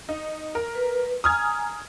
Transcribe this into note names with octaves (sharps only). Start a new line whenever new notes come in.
D#4
A#4
B4
G#5 A#5 D#6 F6 G#6